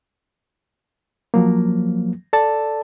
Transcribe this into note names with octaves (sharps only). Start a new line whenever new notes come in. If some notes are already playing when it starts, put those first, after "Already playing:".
F3 F#3 A#3
A4 D5 A5